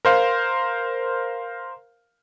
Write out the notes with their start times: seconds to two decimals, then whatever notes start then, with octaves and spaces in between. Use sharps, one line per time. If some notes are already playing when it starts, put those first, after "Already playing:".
0.05 A#4 C5 F5